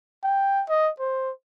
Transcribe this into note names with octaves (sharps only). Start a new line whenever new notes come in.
G5
D#5
C5